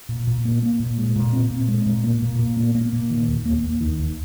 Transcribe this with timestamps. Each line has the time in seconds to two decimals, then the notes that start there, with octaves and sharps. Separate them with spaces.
0.09 A#2
0.27 A#2
0.45 A#3
0.62 A#3
0.80 A#2
0.98 G#3
1.16 A#2
1.33 C4
1.50 A#2
1.68 G#3
1.86 A#2
2.04 A#3
2.22 A#2
2.39 A#2
2.57 A#3
2.75 A#3
2.92 A#2
3.10 D#3
3.28 D#2
3.45 A#3
3.63 D#2
3.81 D#3
3.99 D#2